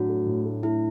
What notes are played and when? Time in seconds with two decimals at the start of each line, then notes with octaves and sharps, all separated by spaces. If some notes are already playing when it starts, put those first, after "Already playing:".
Already playing: A2 F#3 D4 F#4
0.09 A3
0.26 A2
0.45 A3
0.63 A3 E4